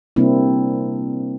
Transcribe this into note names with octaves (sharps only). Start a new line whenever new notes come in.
C3 G3 A#3 C4 D4 E4